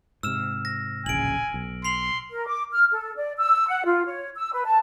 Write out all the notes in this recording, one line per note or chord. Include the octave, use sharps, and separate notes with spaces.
G#2 C3 E6 F6 E7
A#6
D1 A#1 C#3 G#5 D7 F#7
B1
C6 C7 F7 F#7
A#4
D6
F6
A4
D5
E6
F#5
F4
C#5
E6
B4
A5